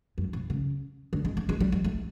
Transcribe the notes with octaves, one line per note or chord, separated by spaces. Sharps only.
F#2
C3
C#3
D3
G#3
A3
G#3
G3
G#3
A3